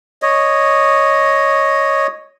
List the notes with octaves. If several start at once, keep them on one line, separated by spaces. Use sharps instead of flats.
C#5 D#5